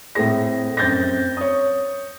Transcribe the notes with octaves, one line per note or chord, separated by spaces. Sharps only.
A2 C4 G#4 A#6
F#2 C4 G6 A6 A#6
C#5 D#6